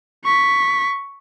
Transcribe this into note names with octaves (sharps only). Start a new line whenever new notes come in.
C#6 B6